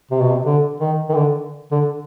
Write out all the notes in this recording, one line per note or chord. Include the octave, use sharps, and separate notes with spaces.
C3
B2
C3
D3
D#3
D#3
D3
D3